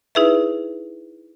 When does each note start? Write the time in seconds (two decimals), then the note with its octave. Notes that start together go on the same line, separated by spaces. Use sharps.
0.15 D#4 E4 G#4 B4 E5